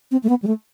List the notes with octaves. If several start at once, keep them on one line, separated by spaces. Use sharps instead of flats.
C4
A3
B3
G3
A3